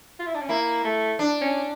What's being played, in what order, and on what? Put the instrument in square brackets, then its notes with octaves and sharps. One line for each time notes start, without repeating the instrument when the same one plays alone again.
[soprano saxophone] F4
E4
D4
C#4
[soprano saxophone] A#3 [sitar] E4
[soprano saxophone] A3
[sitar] D4
[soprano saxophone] C#4